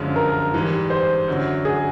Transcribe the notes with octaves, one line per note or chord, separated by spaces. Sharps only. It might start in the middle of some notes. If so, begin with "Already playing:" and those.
Already playing: F#2 D3 F3 G#3
A#4
G#2 E3 G3
C5
F#2 D3 F#3
G#4